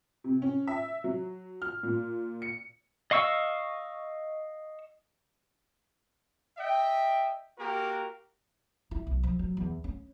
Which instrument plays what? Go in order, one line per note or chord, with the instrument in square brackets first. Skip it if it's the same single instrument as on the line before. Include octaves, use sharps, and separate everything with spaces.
[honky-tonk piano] C3
C#4
E5
F#3
F6
A#2
C#7
[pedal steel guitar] D#5 F5 C#6 E6
[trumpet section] D#5 E5 G5
A#3 F#4 G4 A#4
[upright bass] E4
B1
F3
F#3
E2
C#4